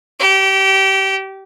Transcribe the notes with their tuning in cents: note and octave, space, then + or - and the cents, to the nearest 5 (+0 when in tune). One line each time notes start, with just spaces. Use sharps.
G4 -25